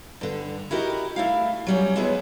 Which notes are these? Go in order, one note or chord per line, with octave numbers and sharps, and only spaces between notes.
G2 D3
E4 F#4 G4 A#4 D#5
A3 E4 F5
F#3 G3 C#4
E2 G#3 B3 E4 G#4